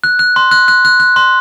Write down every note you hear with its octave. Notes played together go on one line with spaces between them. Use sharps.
F#6
F#6
C6
F#6
F#6
F#6
F#6
C6